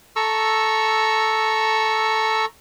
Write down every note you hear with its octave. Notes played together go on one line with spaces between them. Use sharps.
A4 A#5 C#6 E6